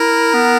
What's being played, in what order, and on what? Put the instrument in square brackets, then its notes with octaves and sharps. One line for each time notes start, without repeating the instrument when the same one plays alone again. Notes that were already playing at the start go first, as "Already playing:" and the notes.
Already playing: [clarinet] E4 [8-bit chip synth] A#4
[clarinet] B3